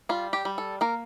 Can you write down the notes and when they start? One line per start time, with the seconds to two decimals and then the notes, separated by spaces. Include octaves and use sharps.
0.09 G3 F4
0.33 G4
0.45 G3
0.58 A4
0.81 A#3 A#4